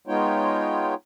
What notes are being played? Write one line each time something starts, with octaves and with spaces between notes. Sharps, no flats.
G#3 B3 D#4 F4 C#5 G5